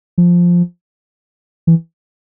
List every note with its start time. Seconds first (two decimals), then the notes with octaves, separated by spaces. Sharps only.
0.18 F3
1.67 E3